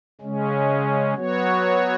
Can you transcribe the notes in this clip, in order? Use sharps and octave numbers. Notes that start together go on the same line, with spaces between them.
C#3 G#3 C#4
F#3 B3 F#4 C#5